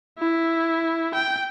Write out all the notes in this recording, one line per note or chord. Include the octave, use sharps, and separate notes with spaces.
E4
G5